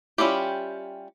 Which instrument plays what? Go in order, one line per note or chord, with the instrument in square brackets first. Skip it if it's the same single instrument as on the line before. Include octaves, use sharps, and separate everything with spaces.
[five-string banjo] G3 C#4 E4 F4 G4